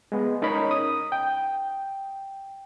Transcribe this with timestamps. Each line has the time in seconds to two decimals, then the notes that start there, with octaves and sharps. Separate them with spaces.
0.12 G#3 B3
0.42 C#4 D#4 A#4 C#5 B5
0.71 D#6
1.12 G5